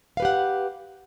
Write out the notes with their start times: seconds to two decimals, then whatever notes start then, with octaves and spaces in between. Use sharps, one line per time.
0.17 F5
0.20 B4
0.22 G4
0.25 F#5